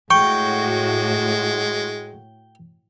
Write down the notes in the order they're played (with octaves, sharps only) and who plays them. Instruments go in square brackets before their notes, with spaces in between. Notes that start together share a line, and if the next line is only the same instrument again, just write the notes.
[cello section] A2 F#4 [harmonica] G#3 [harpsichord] G5 [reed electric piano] C#6